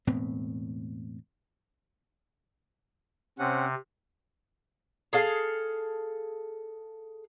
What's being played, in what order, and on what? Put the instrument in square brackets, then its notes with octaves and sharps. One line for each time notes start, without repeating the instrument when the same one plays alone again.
[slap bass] E1 A2 B3 C4
[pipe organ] C3 [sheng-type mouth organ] C4 C#4 F#5
[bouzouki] G#4 A4 F5